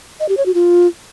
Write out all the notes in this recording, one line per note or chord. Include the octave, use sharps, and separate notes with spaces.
D#5
G4
C#5
F#4
F4